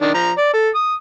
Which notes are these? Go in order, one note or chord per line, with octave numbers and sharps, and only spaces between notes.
D#3 D4
F3 A#5
D5
A4
D#6